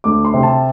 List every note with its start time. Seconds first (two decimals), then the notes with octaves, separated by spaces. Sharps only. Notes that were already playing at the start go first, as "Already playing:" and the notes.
0.04 D2 D6
0.25 C6
0.34 C3
0.43 A5